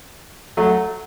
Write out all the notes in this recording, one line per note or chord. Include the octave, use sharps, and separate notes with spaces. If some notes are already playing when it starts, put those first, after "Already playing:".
F#3 A3